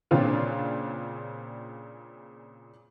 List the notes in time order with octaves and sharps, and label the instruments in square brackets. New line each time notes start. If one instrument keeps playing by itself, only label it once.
[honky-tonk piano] A#2 C#3 C4 D4 F4